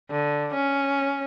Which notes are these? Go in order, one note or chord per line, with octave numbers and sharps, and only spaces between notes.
D3
C#4